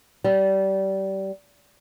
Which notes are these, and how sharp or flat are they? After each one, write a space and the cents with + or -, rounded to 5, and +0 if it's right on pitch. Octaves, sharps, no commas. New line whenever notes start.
G3 -25